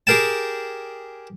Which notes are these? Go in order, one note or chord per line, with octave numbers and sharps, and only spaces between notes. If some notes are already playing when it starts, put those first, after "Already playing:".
G4 G#4 A#4 G5 A5